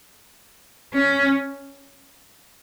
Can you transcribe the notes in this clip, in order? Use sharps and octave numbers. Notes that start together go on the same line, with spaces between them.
C#4